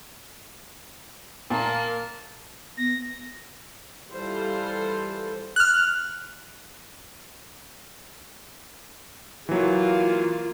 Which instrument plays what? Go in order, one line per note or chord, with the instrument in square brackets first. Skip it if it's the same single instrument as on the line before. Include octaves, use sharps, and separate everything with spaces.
[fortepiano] A#2 [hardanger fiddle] A#3 A#4 [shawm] A5
[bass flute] B3 [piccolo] A#6
[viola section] E3 G3 F4 A4 C5
[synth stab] F6 F#6
[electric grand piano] E3 F#3 [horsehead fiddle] A#3 F4